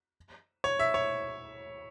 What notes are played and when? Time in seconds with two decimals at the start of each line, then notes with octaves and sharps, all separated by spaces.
0.64 C#5
0.79 E5
0.94 C#5